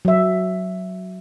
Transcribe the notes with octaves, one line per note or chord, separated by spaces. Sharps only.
F#3 E5